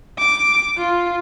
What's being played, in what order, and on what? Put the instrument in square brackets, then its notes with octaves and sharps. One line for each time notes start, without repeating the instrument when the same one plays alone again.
[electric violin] D6
F4